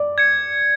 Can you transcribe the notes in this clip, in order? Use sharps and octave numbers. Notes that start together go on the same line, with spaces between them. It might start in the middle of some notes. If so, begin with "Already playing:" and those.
Already playing: D5
G#6 C#7